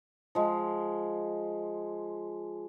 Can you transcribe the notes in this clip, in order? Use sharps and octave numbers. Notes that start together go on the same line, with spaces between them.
F3 G#3